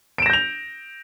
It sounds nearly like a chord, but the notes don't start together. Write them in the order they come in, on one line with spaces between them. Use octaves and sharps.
D7 E7 A#6 G6 F7